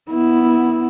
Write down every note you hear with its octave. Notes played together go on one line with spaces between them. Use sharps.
B3 E4